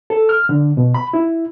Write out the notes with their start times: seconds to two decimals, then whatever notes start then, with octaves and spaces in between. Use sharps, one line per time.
0.10 A4
0.29 F6
0.49 D3
0.77 B2
0.94 B5
1.13 E4